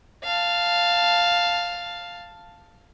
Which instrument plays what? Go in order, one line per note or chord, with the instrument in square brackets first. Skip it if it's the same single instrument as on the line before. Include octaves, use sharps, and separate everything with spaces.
[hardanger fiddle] F5 A5